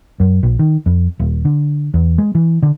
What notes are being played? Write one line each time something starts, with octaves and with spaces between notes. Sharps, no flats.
F#2
A#1
D#3
F2
D#1
D3
E2
G#3
E3
D3